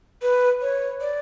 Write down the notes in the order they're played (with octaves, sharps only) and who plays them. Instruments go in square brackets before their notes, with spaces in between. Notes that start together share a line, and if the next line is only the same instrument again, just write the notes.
[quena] B4
C#5
D5